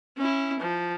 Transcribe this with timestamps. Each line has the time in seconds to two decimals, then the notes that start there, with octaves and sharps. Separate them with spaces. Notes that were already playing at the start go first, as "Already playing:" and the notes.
0.17 C#4 E4
0.60 F3